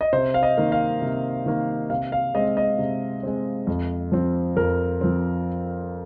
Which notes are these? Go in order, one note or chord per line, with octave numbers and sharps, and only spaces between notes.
D#5
C3 C5
F5
D#5
D#3 A#3
F5
C3
D#3 A#3
C3 F5
F5
G#3 C4 D#5
D#5
C3
G#3 C4
F2
F3 C4
F2 A#4
F3 C4